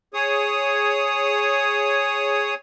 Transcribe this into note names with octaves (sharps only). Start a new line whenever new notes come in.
G#4 C#5 D#6